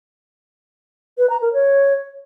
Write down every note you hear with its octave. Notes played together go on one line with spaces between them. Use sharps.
B4
A#5
A#4
C#5